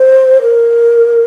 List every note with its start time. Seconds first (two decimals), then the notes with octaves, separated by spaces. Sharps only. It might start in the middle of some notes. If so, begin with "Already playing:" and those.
Already playing: C5
0.42 A#4